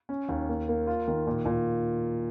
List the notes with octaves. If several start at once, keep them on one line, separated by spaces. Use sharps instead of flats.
C#4
D#2
A#3
A#3
F4
D#3
A#2
A#2